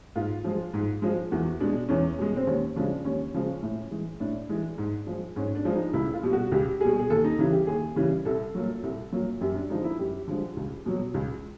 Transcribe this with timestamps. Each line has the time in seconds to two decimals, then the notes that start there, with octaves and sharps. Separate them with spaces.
0.15 G#2 F4
0.44 F3 G#3
0.74 G#2
1.02 F3 G#3
1.32 E2 F#4
1.60 B2 G#3 D4
1.89 E2 C#4
2.19 B2 G#3
2.36 C4
2.47 D#2 C#4
2.76 C#3 F3 G#3 D4
3.04 D#2 C#4
3.34 C#3 F3 G#3
3.62 A2
3.91 E3 G#3
4.20 A2 D4
4.49 E3 G#3
4.78 G#2
5.07 F3 G#3
5.36 G#2 C#4
5.55 D4
5.65 F3 G#3
5.75 D#4
5.93 C#2 E4
6.14 F4
6.23 B2 G3
6.33 F#4
6.52 C#2 G4
6.80 B2 G3 G#4
6.99 G#4
7.10 D#2 A4
7.24 D#4
7.39 C#3 E3 G3
7.52 G4
7.67 D#2 G#4
7.96 C#3 E3 G3
8.25 C2 A4
8.55 A#2 F#3
8.83 C2
9.12 A#2 F#3
9.41 F#2 G4
9.55 D4
9.69 D3 F3 G#3 D#4
9.84 E4
9.99 F#2 G4
10.27 D3 F3 G#3
10.57 C#2
10.86 B2 F#3
11.14 C#2